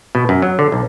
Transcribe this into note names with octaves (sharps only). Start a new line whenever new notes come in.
B2
F#2
F#3
D3
B1